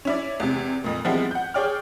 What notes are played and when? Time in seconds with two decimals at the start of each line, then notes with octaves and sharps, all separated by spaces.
0.05 C#4 E4 D5
0.40 E2 C3
0.84 F2 A#2
1.05 F3 G3 G#3 B3 C4 E4
1.31 F#5 G6
1.54 G#4 C#5 D5 G5 F6